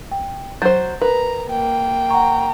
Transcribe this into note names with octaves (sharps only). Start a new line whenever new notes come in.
G5
F#3 C5 G6 A6
A#4 B4 A#5
A#3 G5
F#5 A#5 C#6